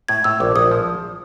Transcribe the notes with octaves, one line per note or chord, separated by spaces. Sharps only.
A2 G#6
A2 E6
A#1 D6
A#1 D#6
F3